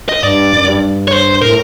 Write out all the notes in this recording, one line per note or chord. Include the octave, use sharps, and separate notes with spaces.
D#5
G2 D5
F#2
G2
C#5
C5
A2 A#4